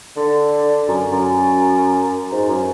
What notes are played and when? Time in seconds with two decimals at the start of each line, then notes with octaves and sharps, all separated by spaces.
0.16 D3
0.88 F#2
1.12 F#2
2.31 G#2
2.48 F#2